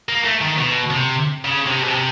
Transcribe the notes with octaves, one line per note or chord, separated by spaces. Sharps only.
A#3
A3
D#3
B2
C3
C#3
C3
B2
C3